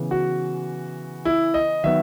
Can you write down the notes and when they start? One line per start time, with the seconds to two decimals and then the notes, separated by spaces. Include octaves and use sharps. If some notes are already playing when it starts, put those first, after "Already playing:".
Already playing: C#3 E3 B3
0.11 F#4
1.25 E4
1.54 D#5
1.84 D#3 F#3 B3 E5